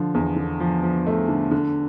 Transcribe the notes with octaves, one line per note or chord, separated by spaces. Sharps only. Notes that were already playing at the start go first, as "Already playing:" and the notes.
Already playing: D3 F3
E2
D3
F3
F3
A3
D3
D3